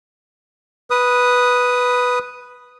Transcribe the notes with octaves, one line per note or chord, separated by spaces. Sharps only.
B4 D#6